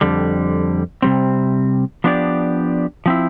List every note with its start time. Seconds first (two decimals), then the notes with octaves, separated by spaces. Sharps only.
0.01 F2 D3 G3
1.02 C3 G3 C4
2.04 F3 B3 D4 G4 D5
3.06 F3 C4 E4